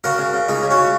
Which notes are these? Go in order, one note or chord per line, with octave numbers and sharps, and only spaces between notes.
C#3 F#4 A#4
C#3
C#3
C#2 D#4 G#4
C#3
C#4 F#4
C#3